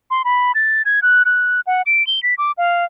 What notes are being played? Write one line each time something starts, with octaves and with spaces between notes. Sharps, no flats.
C6
B5
A6
G#6
F#6
F#6
F#5
D7
G7
B6
D6
F5